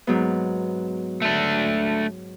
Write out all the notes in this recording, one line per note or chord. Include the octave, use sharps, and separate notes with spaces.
G#2 F#3 B3
A3 D4